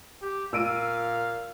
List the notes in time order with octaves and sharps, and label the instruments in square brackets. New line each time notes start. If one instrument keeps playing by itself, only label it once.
[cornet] G4
[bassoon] A#2 [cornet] F5 [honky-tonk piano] E6 D7 D#7